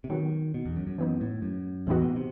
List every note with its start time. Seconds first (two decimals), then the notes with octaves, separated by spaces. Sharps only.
0.04 C3
0.10 D#3 F#3 B3 F#4
0.54 B2
0.65 E2
0.76 F#2
0.87 F#2
0.98 F#2 E3 B3 D#4
1.21 A2
1.42 F#2
1.87 E2 A2 E3 B3 D#4 F#4
2.02 B2
2.16 C3